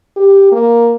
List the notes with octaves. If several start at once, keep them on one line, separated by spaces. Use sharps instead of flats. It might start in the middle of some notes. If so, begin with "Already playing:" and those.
G4
A#3